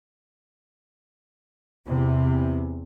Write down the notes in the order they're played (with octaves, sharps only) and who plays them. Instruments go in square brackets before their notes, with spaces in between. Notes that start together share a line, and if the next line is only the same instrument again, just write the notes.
[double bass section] E2 C3